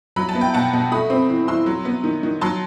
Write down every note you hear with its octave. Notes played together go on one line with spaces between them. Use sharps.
F#3 B5
A5
B3
G5
B2 F#5 A5
B2
A3 B5 D#6
C4
E3
E3 C6 E6
F#3
B3
D#3
D#3
F#3 A5 C6